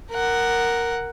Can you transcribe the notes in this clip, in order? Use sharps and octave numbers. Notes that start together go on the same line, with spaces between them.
A#4 F#5